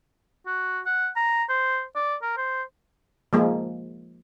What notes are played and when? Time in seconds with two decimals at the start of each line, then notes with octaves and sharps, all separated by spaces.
0.46 F#4
0.86 F#5
1.16 A#5
1.49 C5
1.96 D5
2.22 A#4
2.37 C5
3.33 F3 G#3 A#3